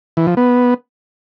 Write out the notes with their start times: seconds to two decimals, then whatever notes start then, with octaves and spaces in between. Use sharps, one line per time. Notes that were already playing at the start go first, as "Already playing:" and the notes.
0.17 E3
0.27 F3
0.37 B3